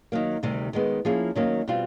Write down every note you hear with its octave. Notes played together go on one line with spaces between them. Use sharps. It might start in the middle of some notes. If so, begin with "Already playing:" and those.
D#3 F#3 A#3
D2 C3 D#3 G3
D#3 G#3 B3
F3 A#3 C#4 E4 G#4
D#3 F#3 A#3 C#4
B2 G3 C4 F4